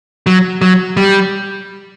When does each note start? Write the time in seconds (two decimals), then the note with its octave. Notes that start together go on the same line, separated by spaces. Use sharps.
0.26 F#3
0.62 F#3
0.97 G3